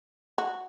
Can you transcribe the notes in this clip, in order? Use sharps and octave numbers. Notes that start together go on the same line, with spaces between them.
F#4